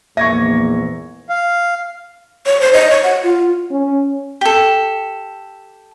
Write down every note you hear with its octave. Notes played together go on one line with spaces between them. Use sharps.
A#1 E2 G#2 A#3 E5 C#6 G#6 A#6
F5
C#5
C5
D#5
C#5
F#5
F4
C#4
G4 A4